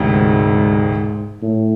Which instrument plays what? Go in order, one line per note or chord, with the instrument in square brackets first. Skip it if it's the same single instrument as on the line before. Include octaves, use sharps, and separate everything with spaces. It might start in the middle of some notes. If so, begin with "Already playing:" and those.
Already playing: [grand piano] E1 D2 C3 [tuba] G#2
[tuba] A2